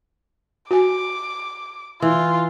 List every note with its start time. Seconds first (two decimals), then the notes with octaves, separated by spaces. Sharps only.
0.71 F#4 G#5 D6
2.02 E3 F4